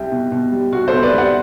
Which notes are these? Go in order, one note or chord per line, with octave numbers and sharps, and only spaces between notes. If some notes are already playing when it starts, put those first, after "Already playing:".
Already playing: C2 G3 G4
B2
B2
G3
B2 F#4
A4 C5
B2
B4 D5
G3
D5 F#5